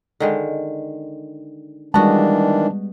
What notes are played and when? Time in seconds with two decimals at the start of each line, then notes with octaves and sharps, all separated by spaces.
0.20 D3 D#3 G#3
1.94 D#3 E3 G3 G#3 B3 D4 F#4 A5